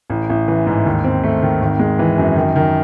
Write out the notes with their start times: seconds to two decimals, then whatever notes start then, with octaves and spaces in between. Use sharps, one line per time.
0.10 A1
0.29 A1
0.48 E3
0.67 G#2
0.86 D#2
1.04 C4
1.23 A3
1.42 D#3
1.62 G#1
1.79 G#3
1.99 E3
2.18 F#2
2.36 D#3
2.56 D#3